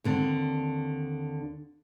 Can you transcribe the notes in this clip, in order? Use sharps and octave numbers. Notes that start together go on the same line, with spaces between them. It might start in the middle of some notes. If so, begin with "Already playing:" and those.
D#2 D3 C4